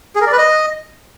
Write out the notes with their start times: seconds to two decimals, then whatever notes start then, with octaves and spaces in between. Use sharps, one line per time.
0.15 G#4
0.21 A#4
0.27 D5
0.32 B4
0.38 D#5